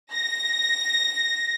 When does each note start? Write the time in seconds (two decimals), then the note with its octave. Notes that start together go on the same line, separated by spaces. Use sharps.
0.12 A#6